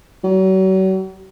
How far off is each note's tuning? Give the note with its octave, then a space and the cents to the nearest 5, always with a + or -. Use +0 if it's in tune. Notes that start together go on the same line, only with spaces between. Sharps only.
F#3 +40